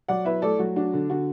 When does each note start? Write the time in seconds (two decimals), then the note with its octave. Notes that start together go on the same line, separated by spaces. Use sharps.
0.08 F#3 D5 F#5
0.25 E4 B4 E5
0.42 A3 A4 D5
0.59 F#3 F#4
0.76 D4 F#4
0.94 D3
1.10 D3 F#4